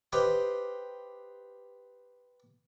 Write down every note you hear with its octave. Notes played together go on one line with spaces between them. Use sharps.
G4 B4 C5 D#5 F5 G5